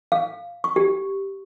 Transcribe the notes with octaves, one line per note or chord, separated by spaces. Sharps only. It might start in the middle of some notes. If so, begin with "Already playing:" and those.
F5
C#6
G4